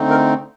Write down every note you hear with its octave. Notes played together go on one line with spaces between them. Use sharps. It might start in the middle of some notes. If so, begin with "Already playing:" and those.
Already playing: D3 A3 C4 D#4
A#4